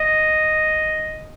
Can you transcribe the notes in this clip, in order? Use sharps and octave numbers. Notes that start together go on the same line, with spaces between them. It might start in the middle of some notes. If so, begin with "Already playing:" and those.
Already playing: D#5